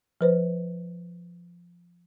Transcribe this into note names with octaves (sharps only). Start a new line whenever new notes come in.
F3 B4 C5